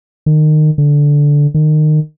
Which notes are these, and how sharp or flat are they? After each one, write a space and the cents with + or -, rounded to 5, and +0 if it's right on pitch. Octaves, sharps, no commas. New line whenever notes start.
D#3 -25
D3 -10
D#3 -25